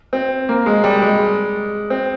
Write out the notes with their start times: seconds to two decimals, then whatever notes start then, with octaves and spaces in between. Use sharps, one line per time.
0.13 C4
0.49 A#3
0.66 G#3
0.84 G3
1.02 G#3
1.90 C4